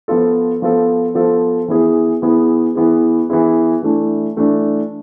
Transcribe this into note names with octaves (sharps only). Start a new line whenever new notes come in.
F3 B3 F4 A4
F3 B3 F4 A4
F3 B3 F4 A4
E3 B3 E4 G#4
E3 B3 E4 G#4
E3 B3 E4 G#4
E3 B3 E4 G#4
E3 A3 D4
E3 A3 D4